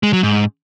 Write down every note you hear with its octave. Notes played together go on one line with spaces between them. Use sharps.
G#3
F#3
G#2